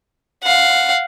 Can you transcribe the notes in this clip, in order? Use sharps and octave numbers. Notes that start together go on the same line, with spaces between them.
F5 F#5